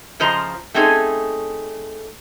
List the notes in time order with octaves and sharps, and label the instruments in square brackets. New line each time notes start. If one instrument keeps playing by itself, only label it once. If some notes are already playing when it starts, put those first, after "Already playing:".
[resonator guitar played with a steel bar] C#3 F3 C5 D#5 A#5
A3 C4 C#4 D#4 G#4